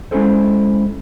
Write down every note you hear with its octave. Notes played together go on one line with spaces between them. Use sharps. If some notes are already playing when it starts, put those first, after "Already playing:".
G#3 C#4 E4 G#4 A4 C5